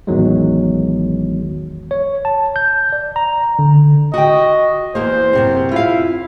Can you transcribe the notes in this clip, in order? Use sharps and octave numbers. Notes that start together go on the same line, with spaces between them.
A1 E2 D#3 F#3 G#3
C#5
A5
G6
D5
A#5
D3
F#4 D#5 G5
E2 A#3 C5
F#2 C3 C4
E4 F4 F5